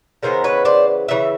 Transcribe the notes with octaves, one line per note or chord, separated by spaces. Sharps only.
C#3 E3 G#3 B3 A#4 C5
B4 C#5
C5 D5
C#3 E3 E5